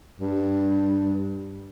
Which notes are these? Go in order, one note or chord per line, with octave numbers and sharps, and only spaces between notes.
G2